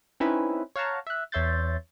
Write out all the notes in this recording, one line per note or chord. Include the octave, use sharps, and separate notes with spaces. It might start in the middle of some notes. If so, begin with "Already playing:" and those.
C4 C#4 D#4 E4 B4 E5
C#5 F5 F#5 A5 A#5
E5 F#6
E2 C#5 E5 C6 G6 A6